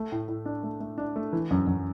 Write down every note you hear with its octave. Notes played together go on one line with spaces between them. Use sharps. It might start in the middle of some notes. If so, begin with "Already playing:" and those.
Already playing: A3
A2
A2
D4
A3
A3
D4
A3
E3
F#2
F#2